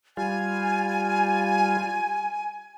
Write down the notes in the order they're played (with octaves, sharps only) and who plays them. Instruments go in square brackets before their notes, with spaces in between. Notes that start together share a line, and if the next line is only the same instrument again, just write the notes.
[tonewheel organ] G3 F4 [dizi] G#5